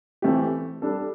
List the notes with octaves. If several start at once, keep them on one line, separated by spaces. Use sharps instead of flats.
E3 A3 C4 G4
G3 D4 A4